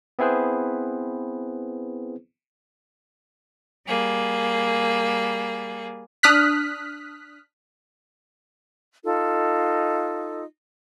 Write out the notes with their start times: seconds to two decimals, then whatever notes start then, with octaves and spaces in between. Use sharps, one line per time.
0.19 B3 C4 E4 G#4 B4 C5
3.87 G3 A#3 G#4
6.23 D4 D#6 F6 F#6 B6
9.03 D#4 F4 A4